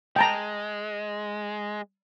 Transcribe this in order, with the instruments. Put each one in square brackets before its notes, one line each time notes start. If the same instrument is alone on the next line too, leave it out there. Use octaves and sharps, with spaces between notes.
[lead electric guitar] G#3 [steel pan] G5 A5 A#5